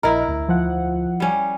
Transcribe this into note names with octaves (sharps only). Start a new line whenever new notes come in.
A#1 E4 A#4 D#5 A#5
D2
F3 F#5
G3 C#4